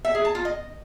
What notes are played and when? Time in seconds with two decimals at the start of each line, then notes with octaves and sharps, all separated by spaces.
0.05 E5
0.15 G#4
0.25 A5
0.35 F4
0.45 D#5